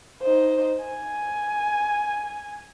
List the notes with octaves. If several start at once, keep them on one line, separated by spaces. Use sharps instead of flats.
D#4 C5
G#5